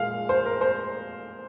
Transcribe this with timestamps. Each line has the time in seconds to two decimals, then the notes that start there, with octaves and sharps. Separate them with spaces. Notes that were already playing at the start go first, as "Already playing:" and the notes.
Already playing: A#2 G#3 F5
0.29 C5
0.46 A#4
0.61 C5